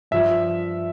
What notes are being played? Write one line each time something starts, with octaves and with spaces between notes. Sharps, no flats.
G2 F3 E5